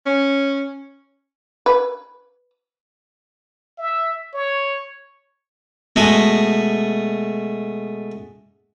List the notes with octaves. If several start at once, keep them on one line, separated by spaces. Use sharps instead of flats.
C#4
B4
E5
C#5
B2 G#3 A3